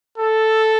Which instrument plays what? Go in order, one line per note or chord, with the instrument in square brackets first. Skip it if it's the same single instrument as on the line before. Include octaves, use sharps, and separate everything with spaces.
[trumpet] A4